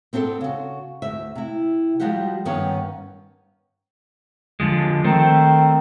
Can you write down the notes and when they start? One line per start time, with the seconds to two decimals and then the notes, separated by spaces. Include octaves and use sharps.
0.13 B3 C4 D4 G4 A4
0.41 C#3 F#4
1.02 D2 E5
1.35 C3 E4
2.00 F3 G3 G#3 F#4 G4 F#5
2.45 G2 D#3 B3 C#4 C#5 F#5
4.60 D3 F3 G#3
5.04 D#3 A3 C4